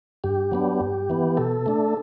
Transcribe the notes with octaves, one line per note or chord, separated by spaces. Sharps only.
G2 G4
F#3 B3 D4
G2
E3 B3
B2 A4
A3 D4